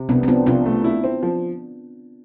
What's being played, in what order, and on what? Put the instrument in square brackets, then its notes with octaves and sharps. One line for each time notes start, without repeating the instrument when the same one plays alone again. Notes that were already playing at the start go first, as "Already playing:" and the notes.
Already playing: [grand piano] C3
[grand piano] C2 [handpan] B3 D4
[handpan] C4
[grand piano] F3 [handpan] B3 D4
[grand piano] C2 [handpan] D4 F4
[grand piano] A3
E4
C4
F3